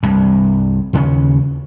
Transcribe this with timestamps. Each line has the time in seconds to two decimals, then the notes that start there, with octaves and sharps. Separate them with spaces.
0.03 C2 G2
0.93 D#2 C#3 G3 C#4